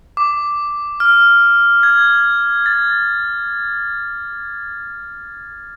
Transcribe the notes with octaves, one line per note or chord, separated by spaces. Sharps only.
D6
F6
G#6
A6